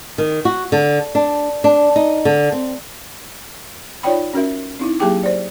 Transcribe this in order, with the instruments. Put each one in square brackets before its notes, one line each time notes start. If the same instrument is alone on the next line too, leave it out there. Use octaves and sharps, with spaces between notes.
[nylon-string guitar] D#3
F#4
D3
D4
D4
D#4
D3
C4
[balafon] D#4 F4 C#5 D5 G5 B5
C#4 F#4 A#4 E5
C4 D#4 E4
F#3 A#3 G4 G#4 G5 D6
C5 D5